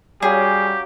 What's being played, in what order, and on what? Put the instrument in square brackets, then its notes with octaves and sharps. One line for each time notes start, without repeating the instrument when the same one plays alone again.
[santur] F#3 C#4 F5 [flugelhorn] G3 [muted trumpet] G4 [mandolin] G#4